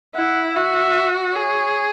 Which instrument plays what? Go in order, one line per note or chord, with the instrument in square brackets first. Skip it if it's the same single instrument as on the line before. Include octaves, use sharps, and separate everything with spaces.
[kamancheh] E4 [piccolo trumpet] F#5
[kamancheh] F#4 [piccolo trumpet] E5
[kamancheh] G#4 [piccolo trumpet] C#5